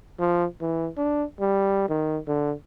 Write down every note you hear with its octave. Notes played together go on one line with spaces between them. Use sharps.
F3
E3
D4
G3
D#3
D3